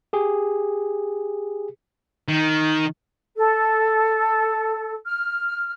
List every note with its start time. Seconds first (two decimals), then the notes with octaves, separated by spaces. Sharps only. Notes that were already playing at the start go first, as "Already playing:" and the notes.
0.13 G4 G#4
2.28 D#3
3.35 A4
5.05 F6